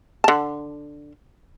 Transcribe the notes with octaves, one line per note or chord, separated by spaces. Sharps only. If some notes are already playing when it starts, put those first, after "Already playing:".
D3 A5